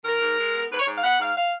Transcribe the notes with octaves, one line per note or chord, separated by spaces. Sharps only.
D#3 A#4
G#2
G#3
B3
G#2 B4
C#5
G#2
F5
B3 F#5
G#2 F5
F5